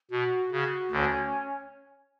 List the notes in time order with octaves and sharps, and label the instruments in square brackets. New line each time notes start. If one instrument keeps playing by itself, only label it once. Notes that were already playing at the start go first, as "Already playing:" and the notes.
[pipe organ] B2 [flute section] F#4
[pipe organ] C#3 [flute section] F#4
[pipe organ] D2 D3 [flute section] C#4